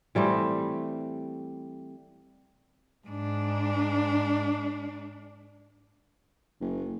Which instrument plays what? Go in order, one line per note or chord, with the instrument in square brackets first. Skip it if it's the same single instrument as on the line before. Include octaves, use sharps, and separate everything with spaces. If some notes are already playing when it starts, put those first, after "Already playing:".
[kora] E3 G3 A3 C4
[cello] G#2 D4
[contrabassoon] F#1